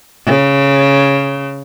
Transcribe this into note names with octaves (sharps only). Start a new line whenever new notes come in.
C#3